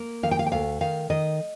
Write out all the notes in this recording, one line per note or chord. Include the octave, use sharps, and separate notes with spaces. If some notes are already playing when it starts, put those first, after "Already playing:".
Already playing: A#3
D#3 F5
G5
F5
G5
D2 F5
D#3 F5
D#3 D#5